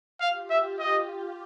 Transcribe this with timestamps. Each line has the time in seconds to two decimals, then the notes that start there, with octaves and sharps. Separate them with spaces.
0.21 F4 G4 F5
0.50 E5
0.79 D#5